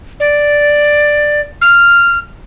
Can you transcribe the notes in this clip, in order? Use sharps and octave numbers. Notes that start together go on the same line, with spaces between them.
D5
F6